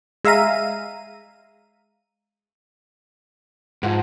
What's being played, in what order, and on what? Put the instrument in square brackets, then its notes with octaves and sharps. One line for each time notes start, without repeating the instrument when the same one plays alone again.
[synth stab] G#3 E5 F5 A#5 D#7
[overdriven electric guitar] G#2 [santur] F3 F#5